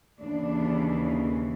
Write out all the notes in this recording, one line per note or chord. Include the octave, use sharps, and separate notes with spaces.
D#2 C#3 E3 D4